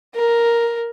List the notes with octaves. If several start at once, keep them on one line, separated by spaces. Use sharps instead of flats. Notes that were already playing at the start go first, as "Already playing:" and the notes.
A#4